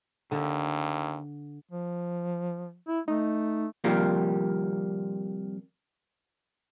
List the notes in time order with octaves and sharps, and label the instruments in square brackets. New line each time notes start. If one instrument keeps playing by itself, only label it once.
[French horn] D#2 [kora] D3
[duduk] F3
E4
[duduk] A3 [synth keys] D#4
[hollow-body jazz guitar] C3 D#3 F3 G3 A#3 C4